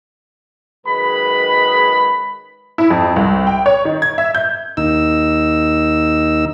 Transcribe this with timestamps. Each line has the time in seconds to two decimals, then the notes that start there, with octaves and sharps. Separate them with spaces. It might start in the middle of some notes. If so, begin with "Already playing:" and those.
0.86 F#2 D#3 G#3 B4 B5
2.78 E4
2.90 F2
3.16 C2
3.47 G5
3.66 C#5
3.85 D#3
4.02 G#6
4.18 E5
4.35 G6
4.77 D#2 D#4 E6